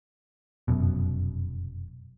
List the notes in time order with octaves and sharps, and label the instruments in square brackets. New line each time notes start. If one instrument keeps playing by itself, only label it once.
[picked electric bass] F1 F#2 B2